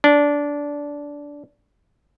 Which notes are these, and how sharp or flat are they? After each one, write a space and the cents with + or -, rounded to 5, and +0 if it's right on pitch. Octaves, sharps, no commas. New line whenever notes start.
D4 -15